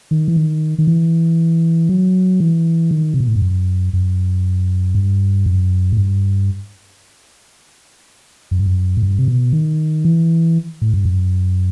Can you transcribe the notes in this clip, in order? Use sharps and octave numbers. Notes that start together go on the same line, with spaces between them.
D#3
E3
D#3
D#3
E3
F#3
E3
D#3
C3
B2
A2
G2
F#2
F#2
G2
F#2
A2
G2
F#2
G2
F#2
A2
G2
C3
B2
D#3
E3
A2
G2
F#2